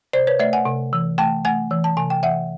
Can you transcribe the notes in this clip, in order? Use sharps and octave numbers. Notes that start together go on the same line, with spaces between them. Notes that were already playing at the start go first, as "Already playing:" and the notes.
C3 C5 D5
B4 C#5
A3 D5 E5
F#5 G#5
C3
E3
A3 G5 A5
A3 F#5 G#5
E3
A5
C3 G#5
G5
E3 E5 F#5